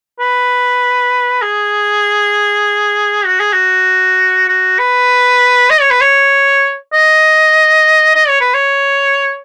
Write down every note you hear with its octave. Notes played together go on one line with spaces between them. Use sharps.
B4
G#4
F#4
G#4
F#4
F#4
B4
D#5
C#5
B4
C#5
D#5
D#5
C#5
B4
C#5